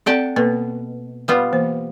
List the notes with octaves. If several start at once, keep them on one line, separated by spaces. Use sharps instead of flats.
C4 A4 D5 F#5 G5 A5
B2 A#3 A4
G3 B3 F4
E3 A#3 C5